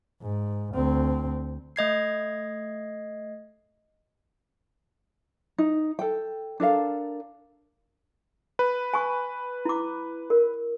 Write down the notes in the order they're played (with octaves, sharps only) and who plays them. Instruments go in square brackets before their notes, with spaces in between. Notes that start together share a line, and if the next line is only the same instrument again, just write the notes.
[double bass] G#2
D2 C4
[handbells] A3 D#5 G#6 C7
[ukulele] D#4
A4 G5
D4 A4 A#4 F5
[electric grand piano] B4
[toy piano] G#5 C#6
E4 D6
A#4